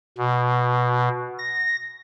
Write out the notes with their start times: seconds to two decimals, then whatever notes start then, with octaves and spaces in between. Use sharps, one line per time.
0.18 B2
1.38 A#6